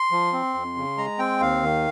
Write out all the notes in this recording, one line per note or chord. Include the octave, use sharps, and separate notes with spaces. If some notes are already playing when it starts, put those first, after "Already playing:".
Already playing: C6
F3
C4
F2
C#3
G#3 A#5
C4 G5
D#2 F5
D#3